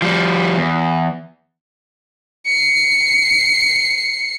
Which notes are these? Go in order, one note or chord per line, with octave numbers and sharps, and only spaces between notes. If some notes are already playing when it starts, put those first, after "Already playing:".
F3 G3
E2
C7 C#7